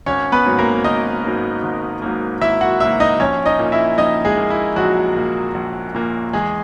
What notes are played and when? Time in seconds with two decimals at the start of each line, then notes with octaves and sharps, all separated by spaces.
0.06 G#1 C#4 C#5
0.32 B3 B4
0.45 G#2 F#3 A#3
0.59 A#3 A#4
0.84 G#1 D#4 D#5
1.24 G#2 F#3 A#3
1.63 G#1
2.02 G#2 F#3 A#3
2.41 G#1 E4 E5
2.61 F#4 F#5
2.80 G#2 F#3 A#3 E4 E5
3.00 D#4 D#5
3.19 A#1 C#4 C#5
3.46 D#4 D#5
3.59 A#2 A#3
3.72 E4 E5
3.98 A#1 D#4 D#5
4.25 G#3 G#4
4.37 A#2 A#3
4.50 E4
4.76 A#1 F#3 F#4
5.16 A#2 A#3
5.54 A#1
5.95 A#2 A#3
6.33 E2 G#3 G#4